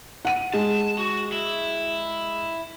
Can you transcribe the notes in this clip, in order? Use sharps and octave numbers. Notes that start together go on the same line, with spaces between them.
F#5 D#7
G#3 A5
F#4
E4